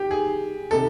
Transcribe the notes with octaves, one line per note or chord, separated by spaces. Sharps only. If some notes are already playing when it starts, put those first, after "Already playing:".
Already playing: G4
G#4
C3 D#3 A4